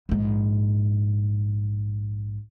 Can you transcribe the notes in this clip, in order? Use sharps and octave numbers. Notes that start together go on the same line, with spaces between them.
A#1 G#2